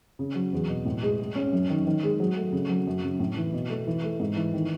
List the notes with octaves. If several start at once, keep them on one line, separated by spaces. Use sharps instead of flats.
C#3
F#3
E2
B2
A2
G#3
G#3
C#4
F#2
D#3
D#3
G#3
F#3
A3
C#3
F#3
F#2
C#3
A2
E3
B2
A3
E3
A3
G#2
E3
D#3